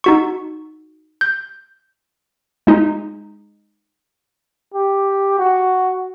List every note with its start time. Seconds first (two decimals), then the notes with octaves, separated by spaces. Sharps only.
0.04 D#4 F#4 C#6
1.21 G6
2.67 G#3 D#4
4.74 G4
5.39 F#4